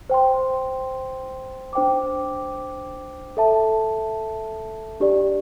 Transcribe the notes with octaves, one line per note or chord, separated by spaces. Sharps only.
C5 G5 C6
D4 C5 G5 D6
A4 E5 A5
D4 G4 D5